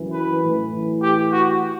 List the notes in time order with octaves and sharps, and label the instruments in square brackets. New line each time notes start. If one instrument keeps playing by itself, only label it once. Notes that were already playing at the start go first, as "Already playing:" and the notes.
Already playing: [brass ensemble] F#2 E3
B4
A2 E3
G4
F#4